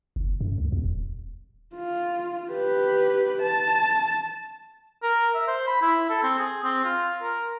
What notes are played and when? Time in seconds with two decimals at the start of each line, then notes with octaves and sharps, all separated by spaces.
0.16 F#1
0.41 F#2
0.58 C#2
0.72 E2
0.85 D#1
1.76 F4
2.50 G4 B4
3.42 A5
5.03 A#4
5.35 E5
5.48 C5
5.67 B5
5.82 E4
6.10 A4
6.23 C4
6.39 G#4
6.64 C4
6.84 F4
7.22 A#4